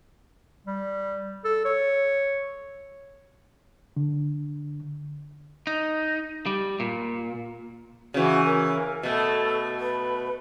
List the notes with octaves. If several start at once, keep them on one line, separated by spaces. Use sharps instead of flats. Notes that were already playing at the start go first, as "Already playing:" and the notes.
G3
A4
C#5
D3
D#4
G3
A#2
C#3 E3 F#4
A#4
B2 A3 A4
B4